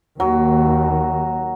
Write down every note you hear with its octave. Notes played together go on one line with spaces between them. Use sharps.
D#2 F#3